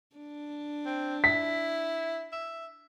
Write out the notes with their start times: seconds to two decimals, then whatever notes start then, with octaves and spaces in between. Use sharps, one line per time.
0.16 D4
0.86 C4
1.24 E4 B6
2.32 E5